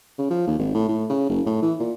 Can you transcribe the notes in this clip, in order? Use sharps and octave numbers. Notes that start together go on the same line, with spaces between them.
C#3
F3
D#2
G#1
A2
A2
C#3
F#1
A2
E3
A#2